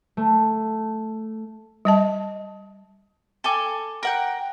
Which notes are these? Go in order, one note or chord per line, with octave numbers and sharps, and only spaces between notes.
A3
G3 D#5 A5
A4 G#5 D6
A#4 F#5 G5